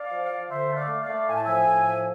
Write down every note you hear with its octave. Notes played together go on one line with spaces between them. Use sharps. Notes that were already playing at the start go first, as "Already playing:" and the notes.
Already playing: D4 D5 F5
F3
F3
D3 C5 E5
A3
D5 F5
A3
D5 F5
A3
A2 G#5
A5
F3 E5 G#5
A2
F3